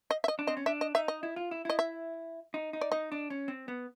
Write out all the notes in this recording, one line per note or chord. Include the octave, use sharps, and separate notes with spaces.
D#5
E5
D#5
D4
C4 D#5
C#4
D4 E5
D#5
D#4 E5
D#5
E4
F4
E4
E4 D#5
E5
D#4
D#4
D5
D#4 D#5
D4
C#4
C4
B3